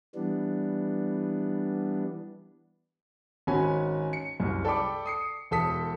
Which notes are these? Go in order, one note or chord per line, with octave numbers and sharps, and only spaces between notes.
E3 G3 B3 D4
G#1 C#4 F#4 G#5 B5
C#7
C2 F#2
A4 D5 G5 B5 D6
D#6 C7 C#7
E1 A4 D#6 B6